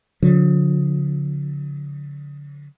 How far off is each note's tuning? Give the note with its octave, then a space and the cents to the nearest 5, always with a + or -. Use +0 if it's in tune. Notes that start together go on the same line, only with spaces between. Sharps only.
D3 -30 F3 +40